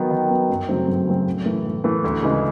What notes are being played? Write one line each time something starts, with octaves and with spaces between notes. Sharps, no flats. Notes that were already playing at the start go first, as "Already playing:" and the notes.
Already playing: D#3 F#3 B3
D#3
F#3 B3
F#2
C#3 F#3 A3 C4
F#2
C#3 F#3 A3 C4
A2
E3 A3
A2
E3 A3
D2
C#3 E3 G#3